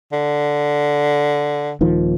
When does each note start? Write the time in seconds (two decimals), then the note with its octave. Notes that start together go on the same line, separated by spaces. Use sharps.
0.12 D3
1.81 D#1 D#3 F3